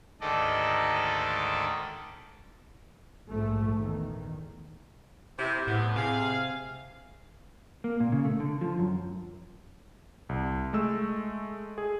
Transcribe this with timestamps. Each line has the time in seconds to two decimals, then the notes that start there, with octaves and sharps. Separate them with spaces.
0.21 D2 G#2 D#3 A4 D5 D#5
3.28 A#1 G#2 F3 A3
3.75 E2 D#3
5.39 C3 E4
5.67 E2 A2 C3 B3
5.96 C3 G#4 F5
7.84 A#3
8.00 A#2
8.12 C#3
8.25 A3
8.40 D3
8.61 F3
8.79 F#2
10.29 C2
10.73 G#3 A3 E6
11.78 G#4